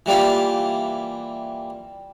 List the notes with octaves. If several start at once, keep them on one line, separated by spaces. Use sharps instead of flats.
E3 G3 A#3 F4